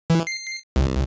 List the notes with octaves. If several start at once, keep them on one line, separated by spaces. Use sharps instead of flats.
E3
C7
C2